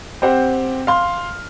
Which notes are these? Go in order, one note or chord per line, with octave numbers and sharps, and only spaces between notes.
C4 G4 C5 F#5
F5 C6 F6